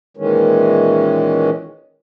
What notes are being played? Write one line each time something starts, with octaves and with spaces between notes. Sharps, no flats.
A#2 D#3 E3 G#3 C#4